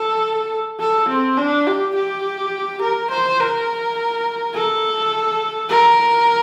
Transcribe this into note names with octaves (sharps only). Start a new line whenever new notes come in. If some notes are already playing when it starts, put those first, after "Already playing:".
Already playing: A4
A4
C4
D4
G4
G4
A#4
C5
A#4
A4
A#4